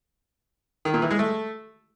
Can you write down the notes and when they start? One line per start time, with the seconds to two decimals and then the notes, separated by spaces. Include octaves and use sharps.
0.85 D#3
0.94 A#2
1.02 E3
1.11 G#3
1.19 A3